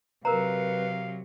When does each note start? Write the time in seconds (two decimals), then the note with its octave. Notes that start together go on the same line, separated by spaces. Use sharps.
0.25 C3 F#3 A#4 B4 F5 A#5